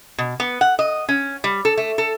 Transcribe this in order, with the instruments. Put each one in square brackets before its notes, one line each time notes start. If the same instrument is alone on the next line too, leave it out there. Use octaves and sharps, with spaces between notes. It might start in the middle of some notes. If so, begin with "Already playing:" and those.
[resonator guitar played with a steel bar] B2
B3
F#5
D#5
C#4
G3
A4
A3
A4